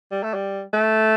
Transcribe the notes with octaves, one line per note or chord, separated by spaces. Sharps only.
G3
A3
G3
A3